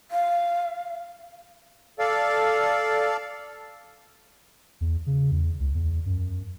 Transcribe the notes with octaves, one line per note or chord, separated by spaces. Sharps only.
F5
A4 D5 F5
E2
C#3
E2
C#2
E2
F#2